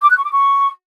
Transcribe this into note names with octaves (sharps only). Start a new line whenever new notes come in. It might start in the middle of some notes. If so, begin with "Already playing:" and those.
D6
F#6
C#6
D6
C#6